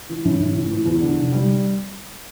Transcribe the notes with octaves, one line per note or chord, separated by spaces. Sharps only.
E3
A1
A1
A2
E3
E2
D3
F1
G3